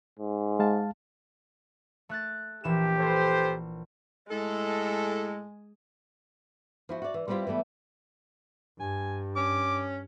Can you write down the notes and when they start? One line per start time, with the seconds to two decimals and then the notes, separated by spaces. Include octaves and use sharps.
0.19 G#2
0.59 G#3 F5 A5
2.09 A3 F#6 A6
2.64 A#1 E3 G4 E7
2.99 A4 B4 C5
4.30 A2 G#3 A4
6.89 F3 E4 F#4
7.02 F#4 D5
7.14 E3
7.28 G3 B3 C4 E4 F4 G4
7.47 E3 G3 A3 B3
8.80 G2 G#5
9.36 C#4 D6